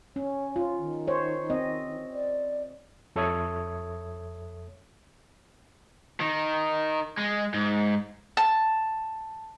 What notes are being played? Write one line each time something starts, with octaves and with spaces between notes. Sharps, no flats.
C#4 C#5
F4
D#3
C5 C#5
C4 D#5
D5
F2 A4 C#5 E5 D#6 G#6
D#3
G#3
G#2
A5